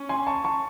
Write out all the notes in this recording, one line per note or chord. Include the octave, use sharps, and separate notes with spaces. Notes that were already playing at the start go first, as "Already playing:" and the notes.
Already playing: C#4
G#5 C6
A5 C#6
A5 C#6